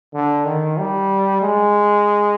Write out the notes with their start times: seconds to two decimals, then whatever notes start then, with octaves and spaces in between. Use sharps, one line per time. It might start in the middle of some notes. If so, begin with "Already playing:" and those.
0.14 D3
0.45 D#3
0.78 G3
1.42 G#3